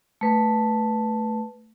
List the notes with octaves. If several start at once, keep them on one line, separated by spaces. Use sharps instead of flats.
A3 B4